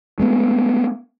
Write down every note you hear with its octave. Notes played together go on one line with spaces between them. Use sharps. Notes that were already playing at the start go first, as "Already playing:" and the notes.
G#3 A3 B3